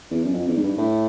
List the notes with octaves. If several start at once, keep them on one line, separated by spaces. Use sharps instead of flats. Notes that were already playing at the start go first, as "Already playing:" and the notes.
E2
F#2
F2
E2
G#2
G2
A2